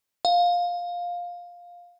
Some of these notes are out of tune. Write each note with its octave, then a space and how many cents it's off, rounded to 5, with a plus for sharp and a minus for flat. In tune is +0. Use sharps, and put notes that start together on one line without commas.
F5 +10